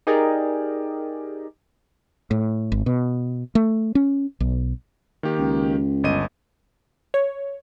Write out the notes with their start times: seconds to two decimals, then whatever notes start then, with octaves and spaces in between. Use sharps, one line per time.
0.07 D#4 G4 G#4 A#4 D5 D#5
2.31 A2
2.72 G#1
2.86 B2
3.55 A3
3.95 C#4
4.40 B1
5.23 D#3 A#3 G4
5.39 C#2
6.04 G1 D#5 D#7
7.14 C#5